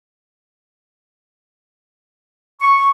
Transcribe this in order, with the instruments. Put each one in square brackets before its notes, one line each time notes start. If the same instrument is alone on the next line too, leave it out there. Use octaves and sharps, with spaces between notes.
[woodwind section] C#6